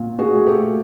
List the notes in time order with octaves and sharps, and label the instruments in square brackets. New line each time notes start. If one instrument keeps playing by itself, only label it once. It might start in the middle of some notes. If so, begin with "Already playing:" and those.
Already playing: [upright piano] A#2
[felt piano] F#4 G#4
[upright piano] A3
[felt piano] G4 A4